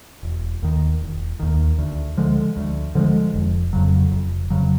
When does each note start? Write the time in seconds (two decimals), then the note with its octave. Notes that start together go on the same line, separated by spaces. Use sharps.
0.23 E1
0.63 D#2 D#3
1.01 E1
1.40 D#2 D#3
1.79 D2
2.17 D3 F3 G#3
2.57 D2
2.95 D3 F3 G#3
3.34 F1
3.73 F2 C#3 F#3
4.12 F1
4.50 F2 C#3 F#3